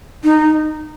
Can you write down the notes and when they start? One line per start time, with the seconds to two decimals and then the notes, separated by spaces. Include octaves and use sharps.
0.24 D#4